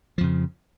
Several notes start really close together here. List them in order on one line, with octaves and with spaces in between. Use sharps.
F3 F2 C#3